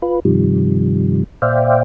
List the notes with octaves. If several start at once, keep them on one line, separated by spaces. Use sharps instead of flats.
F4 B4
G2 C3 D#3 F3 G3
A#2 C5 D5 E5 F5 G5